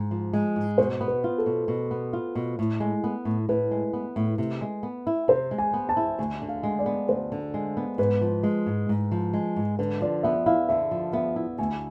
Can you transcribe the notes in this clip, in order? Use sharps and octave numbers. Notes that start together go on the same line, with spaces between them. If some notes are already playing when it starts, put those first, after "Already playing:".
Already playing: G#2
F3
G#3
G#2
B2 C5
B3
B4
F4
A4
B2
B2
B3
F4
B2
A2
G#3
B3
A2
A2 B4
G#3
B3
A2
C3
G#3
B3
E4
C3 C5
G#3
G#5
B3
A5
E4
D2 G#5
D3
F5
G#3
D5
B3
D2 C5
D3
G#3
B3
G#2 B4
F3
G#3
G#2
G#2
F3
G#3
G#2
D3 B4
F3 D5
B3 E5
E4 F5
D3 E5
F3
B3 E5
E4
D2 G#5